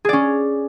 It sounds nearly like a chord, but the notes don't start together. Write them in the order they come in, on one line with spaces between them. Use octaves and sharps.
G#4 D5 C#4